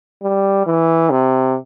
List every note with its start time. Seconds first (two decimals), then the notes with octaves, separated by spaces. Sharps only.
0.23 G3
0.67 E3
1.10 C3